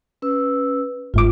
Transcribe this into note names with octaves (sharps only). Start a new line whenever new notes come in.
C#4 B4 E6
G1 G#2 F4 D6